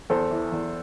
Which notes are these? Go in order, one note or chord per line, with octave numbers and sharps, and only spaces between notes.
E2 A4 C5
E3
E2